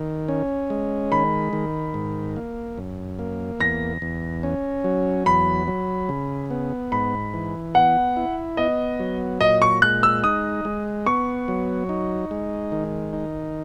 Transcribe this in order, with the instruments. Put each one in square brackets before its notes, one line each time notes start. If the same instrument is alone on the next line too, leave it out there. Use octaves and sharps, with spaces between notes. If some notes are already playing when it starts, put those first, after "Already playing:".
Already playing: [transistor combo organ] D#3
C#4
G#3
[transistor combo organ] D#3 [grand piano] B5
[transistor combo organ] D#3
G#2
A#3
F#2
A#3
[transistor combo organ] E2 [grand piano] A#6
[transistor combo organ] E2
C#4
F#3
[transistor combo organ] E2 [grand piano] B5
[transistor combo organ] F#3
C#3
B3
[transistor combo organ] G#2 [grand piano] B5
[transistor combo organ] E3
[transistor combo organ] B3 [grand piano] F#5
[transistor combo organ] E4
[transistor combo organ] B3 [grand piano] D#5
[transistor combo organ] F#3
[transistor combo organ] A#2 [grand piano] D#5
[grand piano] C#6
[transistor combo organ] G#3 [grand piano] F#6
[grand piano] E6
[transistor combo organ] D#4 [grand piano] D#6
[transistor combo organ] G#3
[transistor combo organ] B3 [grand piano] C#6
[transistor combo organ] F#3
D#4
G#3
D#3
D#4